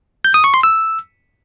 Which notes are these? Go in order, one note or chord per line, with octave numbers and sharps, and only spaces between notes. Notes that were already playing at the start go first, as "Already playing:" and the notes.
G6
D#6
C#6
C6
E6